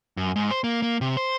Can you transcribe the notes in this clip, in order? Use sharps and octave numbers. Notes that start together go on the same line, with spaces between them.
F#2
G#2
C5
A#3
A#3
C3
C5